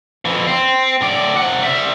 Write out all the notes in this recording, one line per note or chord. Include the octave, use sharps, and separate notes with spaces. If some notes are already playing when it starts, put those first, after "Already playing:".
F2 E3
C4
A2 D5
C3 F#5
G3 E5